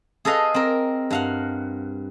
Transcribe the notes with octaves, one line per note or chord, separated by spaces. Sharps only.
G#4 A4 B4 D#5 F5
C4 A#4
G2 F5 F#5